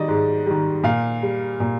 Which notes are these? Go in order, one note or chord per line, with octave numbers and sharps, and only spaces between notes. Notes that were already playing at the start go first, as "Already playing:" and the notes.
Already playing: D#3 G3 D5 D#5
G#2
D#3 G3
A#2 F5
G3
A#2